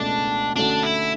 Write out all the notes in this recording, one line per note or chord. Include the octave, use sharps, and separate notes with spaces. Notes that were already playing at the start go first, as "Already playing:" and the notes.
Already playing: C#2 B2 A3 D4
D3 A3 C#4 D4 F#4
E4